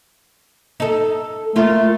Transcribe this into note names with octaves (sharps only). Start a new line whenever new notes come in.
D#4 A4
A3 A#3 F4